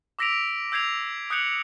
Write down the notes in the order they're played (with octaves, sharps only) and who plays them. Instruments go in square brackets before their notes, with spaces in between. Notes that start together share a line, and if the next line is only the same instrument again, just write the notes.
[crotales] D6 E6 A#6 B6 D7 F7
E6 G6 G#6 C7 F7
D#6 F#6 G6 C#7 F7 F#7